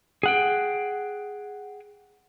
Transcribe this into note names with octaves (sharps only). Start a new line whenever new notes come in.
G#4 F#5 G5